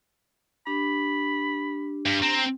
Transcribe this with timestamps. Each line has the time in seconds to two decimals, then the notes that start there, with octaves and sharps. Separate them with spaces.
0.67 D4 G4 B5
2.06 G2
2.22 C4 A#5